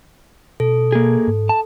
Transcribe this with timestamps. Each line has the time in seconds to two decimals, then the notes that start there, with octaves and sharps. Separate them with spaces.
0.60 B2 A4
0.92 A#3 G#4
1.28 G#2
1.49 A5